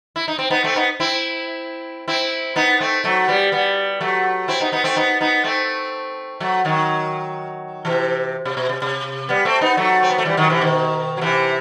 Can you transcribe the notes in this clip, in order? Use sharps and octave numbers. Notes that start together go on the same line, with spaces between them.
E4
D#4
C4
B3 D#4
A3 C4
B3 D#4
C4 E4
C4 E4
B3 D#4
A3 C4
F#3 A3
G3 B3
G3 B3
F#3 A3
C4 E4
B3 D#4
B3 D#4
A3 C4
B3 D#4
B3 D#4
A3 C4
F#3 A3
D#3 F#3
C3 E3
C3
B2
C3
C3
G3 B3
A3 C4
B3 D#4
F#3 A3
C4
B3
A3
E3 G3
D#3 F#3
C3 E3
B2 D#3
F#3
C3 E3